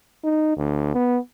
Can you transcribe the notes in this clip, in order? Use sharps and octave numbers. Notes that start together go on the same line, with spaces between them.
D#4
D2
B3